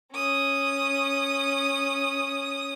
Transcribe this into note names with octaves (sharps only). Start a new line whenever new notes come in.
C#4 D#6